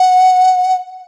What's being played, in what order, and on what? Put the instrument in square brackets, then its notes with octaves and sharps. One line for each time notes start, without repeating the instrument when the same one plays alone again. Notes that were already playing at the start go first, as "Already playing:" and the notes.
Already playing: [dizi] F#5